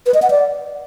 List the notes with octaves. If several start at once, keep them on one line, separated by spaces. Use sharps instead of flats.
B4
D#5
F#5
D5